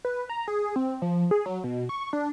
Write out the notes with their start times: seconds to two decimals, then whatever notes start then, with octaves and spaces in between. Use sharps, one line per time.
0.05 B4
0.29 A#5
0.48 G#4
0.76 C4
1.02 F3
1.31 G#4
1.46 F#3
1.64 B2
1.89 C#6
2.13 D4